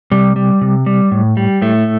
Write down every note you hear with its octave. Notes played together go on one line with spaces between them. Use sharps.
C3 G3
G3
C3
G3
A2
G3
A2 A3